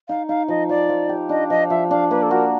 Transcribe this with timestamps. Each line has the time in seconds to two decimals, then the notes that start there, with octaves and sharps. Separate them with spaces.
0.09 D#4 F5
0.29 D#4 F5
0.48 F3 D#5
0.69 F3 D5
0.89 F3
1.09 G4
1.29 D4 D#5
1.50 F3 D#5
1.70 F3 E5
1.91 D4 F5
2.10 A#3 B4
2.23 A4
2.30 F#4 A#4